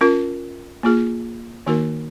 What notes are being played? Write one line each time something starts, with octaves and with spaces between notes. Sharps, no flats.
C#4 F4 A#4
A#3 F4 G#4
D#3 A#3 D#4 F#4 A#4